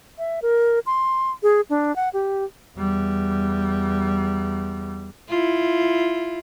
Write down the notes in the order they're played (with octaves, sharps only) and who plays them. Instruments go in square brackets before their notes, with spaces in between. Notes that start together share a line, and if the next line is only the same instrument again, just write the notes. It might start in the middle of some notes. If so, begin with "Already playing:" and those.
[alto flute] E5
A#4
C6
G#4
D4
F#5
G4
[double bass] E2 G3
[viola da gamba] E4 F4